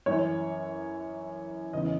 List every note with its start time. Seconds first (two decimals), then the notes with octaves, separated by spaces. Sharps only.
0.06 F#2 E3 C#5
1.73 E2 C#3 E3 D#5